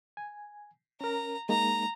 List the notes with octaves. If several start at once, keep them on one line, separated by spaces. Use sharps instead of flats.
G#5
C#4 A#4 A#5
G#3 A#3 D#4 A#5